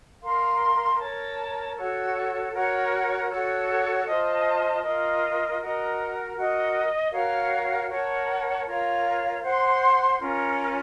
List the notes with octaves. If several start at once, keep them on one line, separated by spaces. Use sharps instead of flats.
A#4 F5 C6
A#4 C#5 A5
F#4 A4 C#5
F#4 A#4 C#5 F#5
F#4 A4 C#5
F4 C5 D#5 A5
F4 A#4 D#5
F#4 A#4 D#5
F#4 A#4 D#5
F#4 A#4 C#5 F5
A#4 C#5 F#5 A5
F4 A#4 C#5 F5
C5 F#5 C6
C#4 F4 A#4